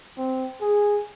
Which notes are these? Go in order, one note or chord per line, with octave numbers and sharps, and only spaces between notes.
C4
G#4